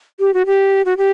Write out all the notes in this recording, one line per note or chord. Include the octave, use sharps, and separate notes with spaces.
G4
F#4
G4
F#4
G4